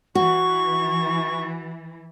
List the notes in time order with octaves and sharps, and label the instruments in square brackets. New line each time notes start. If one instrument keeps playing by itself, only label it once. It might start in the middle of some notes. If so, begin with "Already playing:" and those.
[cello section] E3 [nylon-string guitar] F#4 [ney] C#6